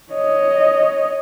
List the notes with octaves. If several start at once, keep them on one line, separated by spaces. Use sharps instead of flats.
C#5 D#5